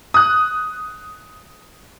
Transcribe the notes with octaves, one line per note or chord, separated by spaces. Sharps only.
D#6 F#6